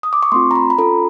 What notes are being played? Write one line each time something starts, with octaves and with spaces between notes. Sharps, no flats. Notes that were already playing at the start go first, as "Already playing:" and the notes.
D#6
D6
C#6
A3 C4 F4 C6
A#5
B5
B5
C#4 F4 A4 A#5